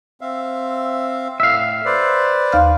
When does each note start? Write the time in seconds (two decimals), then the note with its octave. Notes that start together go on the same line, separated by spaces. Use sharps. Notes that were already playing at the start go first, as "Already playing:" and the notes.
0.21 C4 E5 F5
1.40 A2 E5 F5
1.85 B4 C5 D5
2.52 D#2 F5 F6